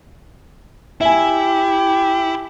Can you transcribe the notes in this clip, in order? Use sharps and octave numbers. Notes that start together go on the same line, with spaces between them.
E4 G4 E5 G#5